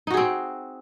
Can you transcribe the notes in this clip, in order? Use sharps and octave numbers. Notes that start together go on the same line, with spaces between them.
C4 D#4 F#4 G#4